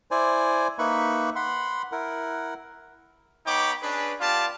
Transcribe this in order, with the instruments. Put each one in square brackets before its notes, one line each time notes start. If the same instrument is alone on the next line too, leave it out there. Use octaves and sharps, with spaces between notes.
[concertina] E4 C5 D5 G#5
A#3 D#4 B4 E5 B5 C#6
F#5 B5 C6
E4 A#4 F#5
[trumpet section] B3 D#4 C#5 G5 B5 D6
C#4 D4 G#4 B4
B3 F4 G4 D5 F5 A5